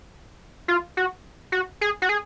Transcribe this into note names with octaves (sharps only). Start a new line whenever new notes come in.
F4
F#4
F#4
G#4
F#4
G#4